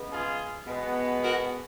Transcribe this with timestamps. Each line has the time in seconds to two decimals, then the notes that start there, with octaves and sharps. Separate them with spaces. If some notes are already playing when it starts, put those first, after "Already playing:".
Already playing: C#3 G#3 B3
0.11 F4 G#4
0.66 B2 G#3 B3
1.22 F#4 A#4